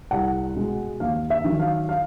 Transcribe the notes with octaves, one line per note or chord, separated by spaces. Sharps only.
C2 F#5
B2 G#3
D#2 F5
E5
D#3 F#3
F5
F5